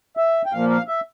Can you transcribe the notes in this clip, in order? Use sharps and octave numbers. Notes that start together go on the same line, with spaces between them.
E5
G5
A#2 F3 A#3 F5
F5
E5